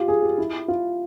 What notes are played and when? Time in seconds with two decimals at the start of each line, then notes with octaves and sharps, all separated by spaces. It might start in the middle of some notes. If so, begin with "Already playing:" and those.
Already playing: F4 G4
0.08 G#4
0.22 G4
0.38 E4
0.68 F4